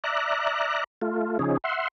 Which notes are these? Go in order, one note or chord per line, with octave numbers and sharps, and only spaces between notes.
D5 E5 A#5 F#6
A3 F4
C#3 F3 C#4 D#4 G#4
E5 F#5 C6